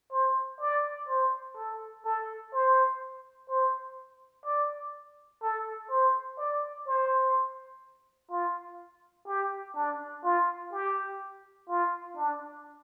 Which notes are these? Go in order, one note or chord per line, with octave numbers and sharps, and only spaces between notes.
C5
D5
C5
A4
A4
C5
C5
D5
A4
C5
D5
C5
F4
G4
D4
F4
G4
F4
D4